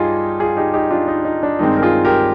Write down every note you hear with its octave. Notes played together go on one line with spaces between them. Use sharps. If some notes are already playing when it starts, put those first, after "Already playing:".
Already playing: G2 D#4 F4 G4 G#4
F4 G#4
D#4 G4
D#4 G4
D4 F4
D#4
D#4
D4
G2 D#3 G#3 C4 D#4
A#4
F4 G#4
G4 A#4